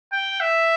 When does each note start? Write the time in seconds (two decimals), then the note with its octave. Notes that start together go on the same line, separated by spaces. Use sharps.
0.13 G5
0.40 E5